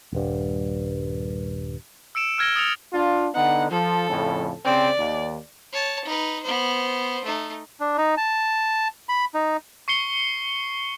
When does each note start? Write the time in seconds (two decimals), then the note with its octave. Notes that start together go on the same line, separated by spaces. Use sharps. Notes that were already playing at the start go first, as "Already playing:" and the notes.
0.12 D#1 G2
2.15 E6 C#7 D7 E7
2.38 E6 F6 G#6 A#6 D7 G7
2.56 D#6 A6 C#7 F7 G7
2.92 D4 F4
3.34 D3 B3 D#4 F#5
3.71 F3 A4
4.08 F2 A2 C#3
4.65 C#3 C4 D5
4.98 D#2
5.73 C#5 A5
6.04 D#4 B4
6.43 B3 C5
7.24 A3 D#4
7.80 D4
7.98 D#4
8.17 A5
9.09 B5
9.34 D#4
9.88 C#6 C7 C#7 G7